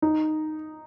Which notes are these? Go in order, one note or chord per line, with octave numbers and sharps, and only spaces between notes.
D#4